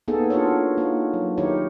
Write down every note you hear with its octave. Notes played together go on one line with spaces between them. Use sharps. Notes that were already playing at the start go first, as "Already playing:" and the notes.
A#3 B3 D#4 G#4 A4
D4 F4 F#4 G#4 A#4 C#5
A#3 D#4
F#3
D#3 D#4 E4 G4 A#4 C#5